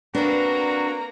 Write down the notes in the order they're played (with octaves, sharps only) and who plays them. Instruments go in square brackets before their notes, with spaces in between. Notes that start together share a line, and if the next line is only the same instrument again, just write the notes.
[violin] A#3 A#5 [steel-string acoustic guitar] C4 D4 [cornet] F#4 [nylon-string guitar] B4